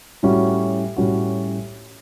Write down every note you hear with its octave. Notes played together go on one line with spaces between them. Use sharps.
A2 G3 C#4 F#4
A2 G3 C#4 F#4